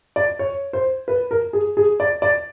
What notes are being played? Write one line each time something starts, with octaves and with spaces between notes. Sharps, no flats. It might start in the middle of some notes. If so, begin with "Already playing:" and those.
D5
C#5
C5
B4
A#4
G#4
G#4
D5
D5